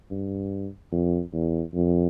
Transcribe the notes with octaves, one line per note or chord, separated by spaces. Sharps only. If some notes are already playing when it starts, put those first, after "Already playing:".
G2
F2
E2
F2